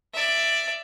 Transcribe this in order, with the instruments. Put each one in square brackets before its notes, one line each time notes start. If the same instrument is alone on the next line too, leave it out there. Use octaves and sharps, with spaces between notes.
[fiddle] D5 E5